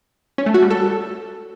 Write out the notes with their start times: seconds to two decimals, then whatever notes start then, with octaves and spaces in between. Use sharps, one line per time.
0.38 C#4
0.46 A3
0.54 F#4
0.62 G3
0.70 A4